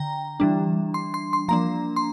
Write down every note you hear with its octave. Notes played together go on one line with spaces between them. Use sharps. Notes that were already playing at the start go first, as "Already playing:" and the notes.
Already playing: D3 G5 A#5
E3 G3 D4
C6
C6
C6
F3 A#3 D4 A#5
C6